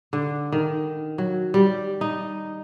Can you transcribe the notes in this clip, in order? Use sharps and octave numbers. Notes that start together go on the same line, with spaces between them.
D3
D#3
F#3
G3
D#4